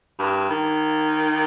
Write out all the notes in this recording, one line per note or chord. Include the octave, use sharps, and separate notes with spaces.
G2
D#3